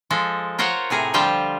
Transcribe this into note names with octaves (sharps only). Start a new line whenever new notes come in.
F3 G#3 A4
F4 A#4 C5 C#5 F#5
A2 C3 G#4 A#4
D3 F3 G3 F4 G5 A5